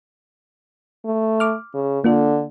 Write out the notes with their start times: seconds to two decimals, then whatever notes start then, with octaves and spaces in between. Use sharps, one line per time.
1.05 A3
1.40 D6 F6
1.74 C#3
2.04 D3 A#3 F4 A4